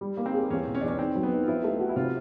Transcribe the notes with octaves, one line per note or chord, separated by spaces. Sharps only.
G3
A#3
C4
G#4
E2 C#4
B2
C#4
E2 D4
C#4
D#3 C4
F#3
B3
D#4
F4
F3 E4
A3
F#4
E4
C3 F4